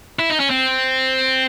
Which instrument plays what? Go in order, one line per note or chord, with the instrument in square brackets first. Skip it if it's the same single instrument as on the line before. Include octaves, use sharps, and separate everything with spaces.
[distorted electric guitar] E4
D#4
C#4
C4